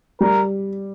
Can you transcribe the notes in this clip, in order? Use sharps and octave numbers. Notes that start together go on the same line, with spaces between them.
G3 A#4